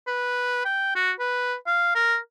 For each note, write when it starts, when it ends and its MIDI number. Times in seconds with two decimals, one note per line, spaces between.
0.07 0.61 71
0.65 0.93 79
0.96 1.12 66
1.20 1.55 71
1.67 1.95 77
1.95 2.17 70